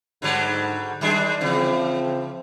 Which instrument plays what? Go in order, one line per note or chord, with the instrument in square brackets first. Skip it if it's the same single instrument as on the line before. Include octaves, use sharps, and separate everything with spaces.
[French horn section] G#2 [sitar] D3 F#3 G3
[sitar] D#3 G#3 D4 [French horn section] G3
[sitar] C#3 E3 [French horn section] F3 C4